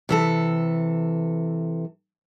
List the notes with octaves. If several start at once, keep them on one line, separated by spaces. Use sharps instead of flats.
C3 E3 A4